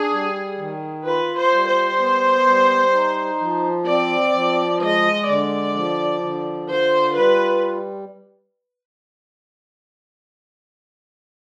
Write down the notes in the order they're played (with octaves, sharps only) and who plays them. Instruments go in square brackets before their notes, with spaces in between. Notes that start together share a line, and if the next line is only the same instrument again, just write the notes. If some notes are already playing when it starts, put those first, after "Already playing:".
Already playing: [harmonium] D4 [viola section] G#4
[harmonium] G3
D#3
[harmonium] F4 [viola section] B4
[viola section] C5
[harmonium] G3
[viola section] C5
[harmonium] B3
G3
D#4
F3
[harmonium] C4 [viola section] D5
[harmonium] F3
[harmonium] G#3 [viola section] D#5
[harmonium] D3 [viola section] D5
[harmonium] F3
D3
[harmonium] F4 [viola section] C5
[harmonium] G3 [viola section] B4